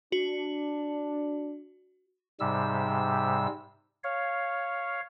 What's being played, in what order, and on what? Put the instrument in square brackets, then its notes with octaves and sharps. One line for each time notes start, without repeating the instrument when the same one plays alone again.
[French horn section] D4 [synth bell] F#4
[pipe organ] G#2 C3 G3 E6
C#5 F5